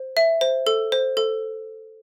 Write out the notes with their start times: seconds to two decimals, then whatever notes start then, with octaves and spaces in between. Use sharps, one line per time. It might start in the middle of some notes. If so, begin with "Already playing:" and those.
Already playing: C5
0.17 E5
0.41 C5
0.67 A4
0.92 C5
1.17 A4